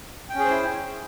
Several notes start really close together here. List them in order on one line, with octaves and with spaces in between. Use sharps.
G5 C#4 G#4 C5 E4